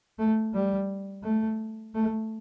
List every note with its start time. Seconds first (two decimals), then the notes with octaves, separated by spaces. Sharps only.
0.19 A3
0.54 G3
1.24 A3
1.95 A3